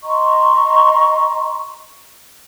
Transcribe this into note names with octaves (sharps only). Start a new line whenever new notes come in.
D#5 A#5 C6 C#6